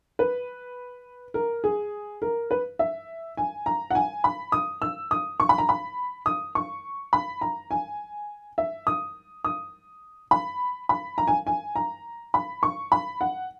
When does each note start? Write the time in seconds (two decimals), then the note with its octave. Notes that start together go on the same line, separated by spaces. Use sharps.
0.19 B4
1.34 A#4
1.64 G#4
2.22 A#4
2.51 B4
2.79 E5
3.37 G#5
3.66 A#5
3.91 F#5
3.95 G#5
4.24 B5
4.52 D#6
4.82 E6
5.11 D#6
5.40 C#6
5.49 B5
5.58 A#5
5.69 B5
6.26 D#6
6.55 C#6
7.13 B5
7.41 A#5
7.71 G#5
8.58 E5
8.87 D#6
9.44 D#6
10.31 B5
10.89 B5
11.18 A#5
11.28 G#5
11.47 G#5
11.76 A#5
12.34 B5
12.63 C#6
12.92 B5
13.21 F#5